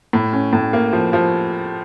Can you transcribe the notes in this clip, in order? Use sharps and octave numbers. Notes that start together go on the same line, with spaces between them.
A2
C#4
A2
A#3
F3
F3